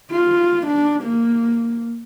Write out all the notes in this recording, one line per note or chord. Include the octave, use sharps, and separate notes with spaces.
F4
D4
A#3